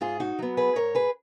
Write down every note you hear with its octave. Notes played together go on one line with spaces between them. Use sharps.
G#2 F4 G#4
D#4 F#4
F#3 B3
G#4 B4
G#2 A#4 C#5
G#4 B4